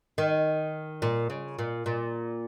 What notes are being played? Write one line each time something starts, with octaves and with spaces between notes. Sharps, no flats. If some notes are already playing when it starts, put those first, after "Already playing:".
D#3
A#2
C#3
A#2
A#2